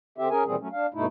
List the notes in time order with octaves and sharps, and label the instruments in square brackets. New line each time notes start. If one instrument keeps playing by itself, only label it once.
[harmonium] D3 C4 G4 E5
C#4 G#4 A#4 G#5
A#2 D#3 E3 G3 C4 G#4
F#3 A3 C#4
D4 F5
G2 B2 A3 D#4 E4